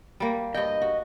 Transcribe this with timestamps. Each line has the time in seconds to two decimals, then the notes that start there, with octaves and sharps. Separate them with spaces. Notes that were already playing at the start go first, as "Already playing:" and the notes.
0.20 G3 A#3
0.54 G2 D#5 G5
0.81 F#4